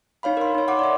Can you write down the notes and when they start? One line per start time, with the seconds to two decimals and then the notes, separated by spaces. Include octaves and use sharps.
0.23 D#4 C#5 F5 B5
0.37 A#4 C6
0.55 D#4 C#5
0.68 F#5 C6 D6
0.79 D5 E5